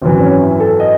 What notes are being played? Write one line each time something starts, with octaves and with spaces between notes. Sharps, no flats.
G#1 F#2 E3 C4
C#4
E4
A4
D#5